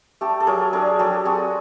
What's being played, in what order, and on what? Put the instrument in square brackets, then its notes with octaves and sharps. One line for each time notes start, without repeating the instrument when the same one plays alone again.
[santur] A3 G4 A4
A4
F#3 G#4 A#4
D4 G#4 A#4
F#3 G4 A4
C4 F#4 G#4